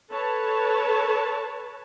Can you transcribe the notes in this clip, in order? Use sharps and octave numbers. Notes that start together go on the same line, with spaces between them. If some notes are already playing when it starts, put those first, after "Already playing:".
A4 B4 C#5 A5